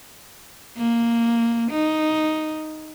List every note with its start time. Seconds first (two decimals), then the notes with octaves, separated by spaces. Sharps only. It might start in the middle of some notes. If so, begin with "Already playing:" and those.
0.78 A#3
1.71 D#4